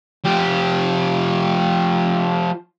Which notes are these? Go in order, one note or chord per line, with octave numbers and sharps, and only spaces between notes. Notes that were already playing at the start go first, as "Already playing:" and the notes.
F3 G4